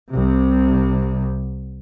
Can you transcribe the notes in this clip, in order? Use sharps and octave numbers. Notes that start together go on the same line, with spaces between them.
C2 C3